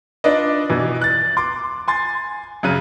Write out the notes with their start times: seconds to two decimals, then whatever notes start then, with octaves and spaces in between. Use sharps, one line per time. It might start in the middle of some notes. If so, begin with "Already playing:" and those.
0.24 D4 D#4 F4 B4 D5 D#5
0.70 B2 E3
1.01 F#6 A6
1.37 C6 D6
1.88 G#5 C6 A6
2.63 F#2 C#3 F#6 D#7